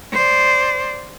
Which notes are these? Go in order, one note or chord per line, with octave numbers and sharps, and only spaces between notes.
C5 D5